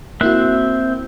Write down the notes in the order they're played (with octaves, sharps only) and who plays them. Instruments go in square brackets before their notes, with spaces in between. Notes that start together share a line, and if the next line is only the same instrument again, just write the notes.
[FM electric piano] A#3 E4 F#4 [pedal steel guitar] C4 E5 F#6